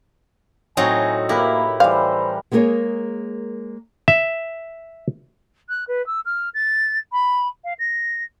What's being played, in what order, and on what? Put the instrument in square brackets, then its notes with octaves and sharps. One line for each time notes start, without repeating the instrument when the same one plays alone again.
[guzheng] A2 F#3 D#4 [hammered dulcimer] C4 C#6 [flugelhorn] G#5
[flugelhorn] A#3 [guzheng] E4 [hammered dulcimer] G4 A#4 B4
[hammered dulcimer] E3 G3 [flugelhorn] C5 [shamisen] F5
[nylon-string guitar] G#3 A#3 B3 G#4 A#4 C#5
[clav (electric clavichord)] E5
[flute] F#6
B4
E6
F6
A6
B5
F5
A#6